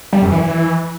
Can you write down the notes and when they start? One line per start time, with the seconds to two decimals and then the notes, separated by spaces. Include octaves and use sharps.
0.13 G3
0.22 F#2
0.32 E3